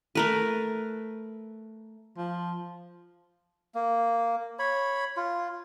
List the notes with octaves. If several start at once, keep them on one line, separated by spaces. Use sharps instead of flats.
A3 A#4 B4
F3
A#3
C#5 B5
F4